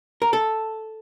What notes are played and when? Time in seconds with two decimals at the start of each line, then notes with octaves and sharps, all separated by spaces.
0.22 A#4
0.33 A4